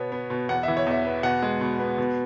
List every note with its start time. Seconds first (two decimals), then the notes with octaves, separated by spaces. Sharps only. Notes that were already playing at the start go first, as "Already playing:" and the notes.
Already playing: B2 B3 C#5
0.12 B3
0.30 B2
0.49 E2 F#5
0.63 E3 E5
0.77 C#5
0.86 E2 E5
1.05 B3
1.23 B2 F#5
1.42 G#3
1.61 B2
1.79 B3
1.98 B2